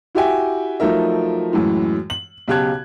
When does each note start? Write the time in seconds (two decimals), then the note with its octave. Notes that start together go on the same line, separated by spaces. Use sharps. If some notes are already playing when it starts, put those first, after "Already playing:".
0.15 E4 F#4 G4 E5 G5 G#5
0.80 F3 F#3 A3 D#4 A#4 E5
1.52 F#2 A2 E3 G#3
2.10 F#7
2.48 B1 C#3 G4 A5 F#6 G#6